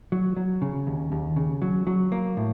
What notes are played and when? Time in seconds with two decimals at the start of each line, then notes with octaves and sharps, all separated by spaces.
0.12 F#3
0.37 F#3
0.62 C#3
0.87 D#2
1.12 D#2
1.36 C#3
1.62 F#3
1.87 F#3
2.12 A#3
2.37 A2